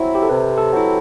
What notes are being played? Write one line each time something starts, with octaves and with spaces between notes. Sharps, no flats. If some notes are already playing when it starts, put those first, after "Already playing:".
Already playing: F#3 C4 E4
G4
A4
C3 B4
A4
F#3 C4 E4